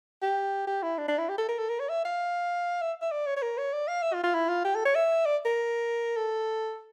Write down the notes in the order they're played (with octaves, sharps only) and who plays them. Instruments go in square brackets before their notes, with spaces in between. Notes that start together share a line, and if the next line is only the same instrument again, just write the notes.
[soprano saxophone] G4
G4
E4
D4
D4
E4
G4
A4
A#4
A4
A#4
C#5
E5
F5
E5
E5
D5
C#5
C#5
A#4
C#5
D5
F5
E5
F4
F4
E4
F4
G4
A4
C#5
E5
D5
A#4
A4